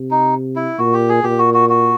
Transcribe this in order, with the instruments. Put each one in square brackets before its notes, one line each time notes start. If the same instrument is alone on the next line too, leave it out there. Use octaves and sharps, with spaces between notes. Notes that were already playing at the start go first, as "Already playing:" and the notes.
Already playing: [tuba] C3
[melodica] D#4
E4
[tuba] A#2 [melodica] F#4
[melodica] G4
G#4
[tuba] A#2 [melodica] G4
[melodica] F#4
F#4
F#4